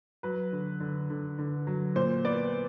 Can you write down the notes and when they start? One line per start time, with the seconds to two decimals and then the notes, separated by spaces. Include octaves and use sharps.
0.23 F#3 B4
0.52 D3
0.80 D3
1.10 D3
1.39 D3
1.67 F#3
1.96 A#2 C5
2.25 B3 D5